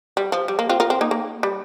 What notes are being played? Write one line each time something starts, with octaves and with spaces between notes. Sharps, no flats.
G3
F3
G3
A#3
C4 F4
F4 A#4
C4
A#3 D#4
A#3
G3